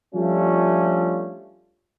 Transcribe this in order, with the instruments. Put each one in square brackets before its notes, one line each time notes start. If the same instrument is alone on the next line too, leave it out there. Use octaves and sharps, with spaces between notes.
[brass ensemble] F3 G3 A3 C#4 D4 F4